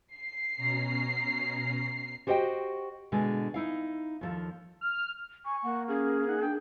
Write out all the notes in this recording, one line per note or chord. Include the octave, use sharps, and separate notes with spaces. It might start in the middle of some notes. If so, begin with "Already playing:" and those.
C7
B2 C#4 A#5
F#4 G4 C5 D#5 E5 G5
B2 D3 G#3
D#4 E4 F5
D#2 F3 A4
F6
G#5 C#6
A#3 F#5
C#4 G#4 F5
D#4 F#5
D4 G5